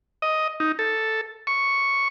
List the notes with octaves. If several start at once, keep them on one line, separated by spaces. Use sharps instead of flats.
D#5
D#4
A4
C#6